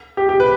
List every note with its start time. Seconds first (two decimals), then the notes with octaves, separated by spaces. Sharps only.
0.17 G4
0.29 G4
0.40 B4